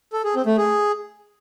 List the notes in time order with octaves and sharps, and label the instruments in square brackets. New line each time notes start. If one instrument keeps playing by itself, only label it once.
[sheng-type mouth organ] A4
G#4
C4
A3
G#4